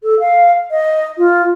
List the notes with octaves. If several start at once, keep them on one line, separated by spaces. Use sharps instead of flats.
A4
F5
D#5
F4